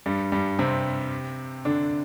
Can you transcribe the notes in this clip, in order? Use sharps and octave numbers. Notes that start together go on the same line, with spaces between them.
G2 G3
G2 G3
C3 C4
D3 D4